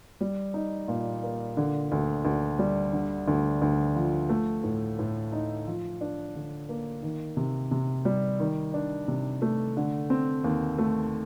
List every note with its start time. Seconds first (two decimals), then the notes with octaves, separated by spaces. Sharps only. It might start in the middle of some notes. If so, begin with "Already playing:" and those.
0.21 G3
0.54 D#4
0.88 A#2
1.23 A#3
1.57 D3
1.92 D2
2.25 D2
2.59 G3
2.93 D3
3.28 D2
3.62 D2
3.96 F3
4.29 A3
4.64 A2
4.99 A2
5.32 D#4
5.67 F3
6.01 D4
6.36 D3
6.69 A#3
7.03 D#3
7.37 C3
7.71 C3
8.05 G3
8.40 D#3
8.74 D4
9.08 C3
9.42 A3
9.77 D3
10.10 C4
10.44 D#2
10.79 A3